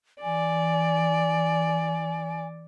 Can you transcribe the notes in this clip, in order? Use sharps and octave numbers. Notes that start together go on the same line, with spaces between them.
E3 D5 G#5